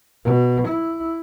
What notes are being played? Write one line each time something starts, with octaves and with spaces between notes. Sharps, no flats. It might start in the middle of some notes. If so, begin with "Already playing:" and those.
B2
E4